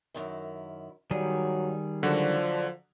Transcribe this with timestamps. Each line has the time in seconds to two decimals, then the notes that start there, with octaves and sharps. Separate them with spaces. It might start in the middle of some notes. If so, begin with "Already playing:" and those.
0.14 F#2 D#3 E4
1.11 G2 D#3 F#3 G3 G#4
2.03 D3 F3 F#3 D4 F#4 A#4